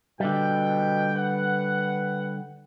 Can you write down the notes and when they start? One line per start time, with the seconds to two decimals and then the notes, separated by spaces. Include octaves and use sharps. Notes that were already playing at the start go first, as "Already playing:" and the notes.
0.20 B2 D3 G3 G5
1.16 B4 F#5